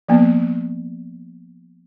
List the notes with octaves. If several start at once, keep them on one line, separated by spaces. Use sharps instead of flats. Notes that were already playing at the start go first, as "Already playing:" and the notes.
F3 A#3 B3